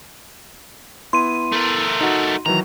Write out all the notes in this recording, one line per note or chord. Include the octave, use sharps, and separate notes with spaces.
B3 E4 C6 D#7
A3 A#4
D#4 F#4
D#3 E3 F#3 A#5